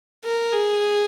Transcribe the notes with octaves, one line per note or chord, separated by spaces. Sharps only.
A#4
G#4